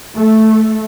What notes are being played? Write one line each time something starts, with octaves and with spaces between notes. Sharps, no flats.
A3